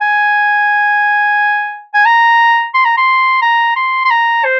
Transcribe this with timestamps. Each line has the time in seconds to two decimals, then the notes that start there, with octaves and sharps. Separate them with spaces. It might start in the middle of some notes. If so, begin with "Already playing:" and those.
0.01 G#5
1.94 G#5
2.06 A#5
2.74 C6
2.85 A#5
2.97 C6
3.42 A#5
3.76 C6
4.05 C6
4.10 A#5
4.45 C5